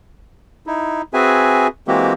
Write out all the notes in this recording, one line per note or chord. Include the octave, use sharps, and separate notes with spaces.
D#4 E4
C4 F#4 G#4 B4 E5 G#5
E3 G#3 A#3 C4 F#4 G4